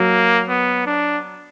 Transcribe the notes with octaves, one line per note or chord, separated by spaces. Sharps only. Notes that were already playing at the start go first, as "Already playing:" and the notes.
Already playing: F#3 A#3
B3
D4